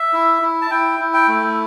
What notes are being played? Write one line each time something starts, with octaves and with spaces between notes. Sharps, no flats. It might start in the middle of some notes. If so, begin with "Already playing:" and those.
Already playing: E5
E4
E4
A5
E4 G5
E4
G5
A3